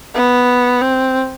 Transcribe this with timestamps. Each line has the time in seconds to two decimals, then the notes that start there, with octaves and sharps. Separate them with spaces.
0.14 B3
0.81 C4